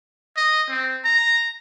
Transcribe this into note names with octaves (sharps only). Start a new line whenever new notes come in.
D#5
C4
A#5